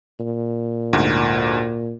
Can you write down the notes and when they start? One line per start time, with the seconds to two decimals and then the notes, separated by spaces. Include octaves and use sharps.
0.20 A#2
0.93 D2 G#2